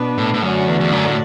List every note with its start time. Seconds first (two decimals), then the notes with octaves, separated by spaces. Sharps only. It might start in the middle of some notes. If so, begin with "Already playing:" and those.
Already playing: B2 B3 D4 B4
0.18 A2
0.34 A2
0.42 F#2 D3 A3 F#4 D5
0.67 E2
0.80 E2
0.92 F#2
1.08 A2